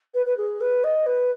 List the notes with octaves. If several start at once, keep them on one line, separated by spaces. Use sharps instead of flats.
B4
B4
G#4
B4
D#5
B4